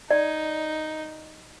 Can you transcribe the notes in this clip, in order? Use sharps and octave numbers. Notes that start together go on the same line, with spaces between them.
D#4 D5